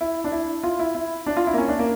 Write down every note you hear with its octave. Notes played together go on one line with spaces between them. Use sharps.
E4
D4
E4
F4
E4
E4
D4
F4
E4
A#3
C#4
D4
A#3